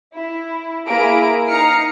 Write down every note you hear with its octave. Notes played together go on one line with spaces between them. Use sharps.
E4
A#3 E4 G#4 A#4 D7
D#4 A#5 F6 C7 C#7